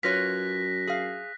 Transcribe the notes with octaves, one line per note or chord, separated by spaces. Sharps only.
F#2 F4 B4 C#5 F#6 A#6 B6
G#4 F5